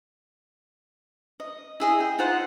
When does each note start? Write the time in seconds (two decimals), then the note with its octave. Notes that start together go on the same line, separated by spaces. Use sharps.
1.40 D#5
1.80 E4 G#4 D#5
2.00 G5
2.18 D#4 F4 C5 F#5